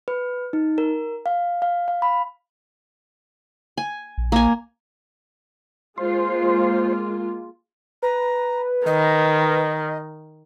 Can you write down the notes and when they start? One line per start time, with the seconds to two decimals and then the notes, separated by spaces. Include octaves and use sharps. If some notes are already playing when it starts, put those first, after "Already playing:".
0.08 B4
0.53 D#4
0.78 A#4
1.26 F5
1.62 F5
1.88 F5
2.02 B5
3.77 G#5
4.18 A#1
4.32 A#3 G#5
5.98 G#3 A#3 F4 C5
8.03 B4 A#5
8.86 D#3 D#5